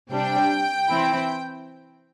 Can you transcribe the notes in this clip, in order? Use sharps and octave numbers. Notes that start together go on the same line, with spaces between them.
C3 G3 D4 G5
E3 C4 E4